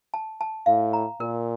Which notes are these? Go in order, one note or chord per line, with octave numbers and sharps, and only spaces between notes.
A5
A5
A2 F5
A#5
A#2 A#4